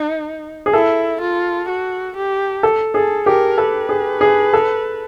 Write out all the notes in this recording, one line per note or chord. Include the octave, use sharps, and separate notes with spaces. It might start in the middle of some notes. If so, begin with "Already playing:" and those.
Already playing: D#4
G#4
E4 A4
F4
F#4
G4
A4
G#4 A4
G4 A#4
A4 B4
G#4
G#4
A4